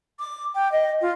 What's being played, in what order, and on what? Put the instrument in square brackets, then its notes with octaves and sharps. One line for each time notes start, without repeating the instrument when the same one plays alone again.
[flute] D6
G5
D#5
F4